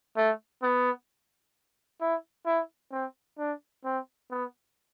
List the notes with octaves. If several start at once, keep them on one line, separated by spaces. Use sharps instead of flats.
A3
B3
E4
E4
C4
D4
C4
B3